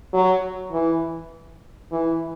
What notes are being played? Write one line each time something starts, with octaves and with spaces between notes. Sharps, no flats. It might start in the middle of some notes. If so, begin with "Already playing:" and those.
F#3
E3
E3